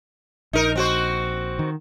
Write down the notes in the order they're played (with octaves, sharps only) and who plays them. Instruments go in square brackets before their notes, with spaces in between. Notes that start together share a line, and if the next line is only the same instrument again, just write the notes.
[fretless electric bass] A#1 [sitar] D#4 A#4
[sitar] C4 F#4 C5
[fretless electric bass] D#3